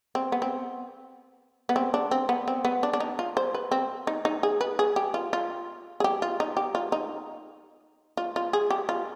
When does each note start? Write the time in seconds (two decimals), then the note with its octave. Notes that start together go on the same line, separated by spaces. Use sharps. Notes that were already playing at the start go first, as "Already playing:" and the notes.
0.15 C4
0.32 B3
0.42 C4
1.69 B3
1.76 C4
1.94 D4
2.11 C4
2.29 B3
2.48 C4
2.65 B3
2.83 D4
2.93 D4
3.00 D#4
3.19 F4
3.37 C5
3.54 B4
3.71 C4
4.07 D#4
4.25 D#4
4.43 G#4
4.61 B4
4.79 G#4
4.96 G4
5.14 F4
5.33 F4
6.00 G#4
6.04 G4
6.22 F4
6.40 D#4
6.57 G4
6.75 F4
6.92 D#4
8.17 F4
8.36 F4
8.53 G#4
8.70 G4
8.89 F4